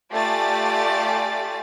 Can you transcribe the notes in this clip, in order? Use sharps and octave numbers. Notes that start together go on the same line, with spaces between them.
A3 F4 G4 D5 G#5 A6